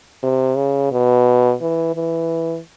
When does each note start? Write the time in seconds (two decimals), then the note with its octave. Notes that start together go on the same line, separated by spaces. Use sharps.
0.23 C3
0.56 C#3
0.92 B2
1.61 E3
1.95 E3